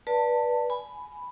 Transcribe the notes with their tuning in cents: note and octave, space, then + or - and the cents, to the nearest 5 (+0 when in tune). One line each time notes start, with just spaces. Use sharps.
B4 -20 D5 +0 A5 +20
G#5 +10 B5 +0